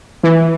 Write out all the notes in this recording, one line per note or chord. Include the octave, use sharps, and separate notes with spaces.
E3